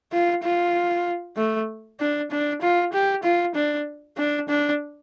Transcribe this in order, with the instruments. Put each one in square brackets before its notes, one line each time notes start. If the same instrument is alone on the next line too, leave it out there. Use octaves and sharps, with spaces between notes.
[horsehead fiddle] F4
F4
A3
D4
D4
F4
G4
F4
D4
D4
D4